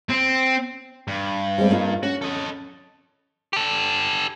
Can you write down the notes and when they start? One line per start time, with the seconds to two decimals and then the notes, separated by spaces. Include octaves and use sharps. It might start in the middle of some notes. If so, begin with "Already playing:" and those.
0.09 C4
1.08 G2
1.58 G3 G#3 C4
1.71 A#3 D#4 F4
2.03 C#4 F#4
2.22 A4 D#5
3.53 G4 A4